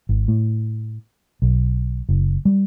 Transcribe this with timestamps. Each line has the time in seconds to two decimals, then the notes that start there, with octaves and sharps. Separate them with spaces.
0.09 G#1
0.28 A2
1.42 B1
2.09 F#1
2.45 G3